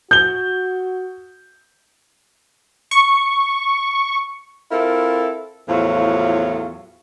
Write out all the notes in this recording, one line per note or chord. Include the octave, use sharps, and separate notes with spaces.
F#4 G6 G7
C#6
C4 E4 F4 A4 A#4
E2 A2 F3 F#3 F4 C#5